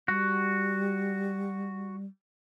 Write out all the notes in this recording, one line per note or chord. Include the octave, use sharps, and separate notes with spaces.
G3 F#4